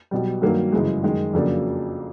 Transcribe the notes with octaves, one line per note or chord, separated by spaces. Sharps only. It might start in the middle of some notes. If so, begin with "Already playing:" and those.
B1 B2 G3
G2 D#3 F#3 A#3
G1 F#2 C#3 E3 G#3
F#2 D#3 G#3
F2 C#3 F#3 A#3 D4